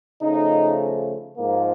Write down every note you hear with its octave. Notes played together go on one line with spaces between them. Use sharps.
C#3 F3 A3 D#4
G#2 F3 A#3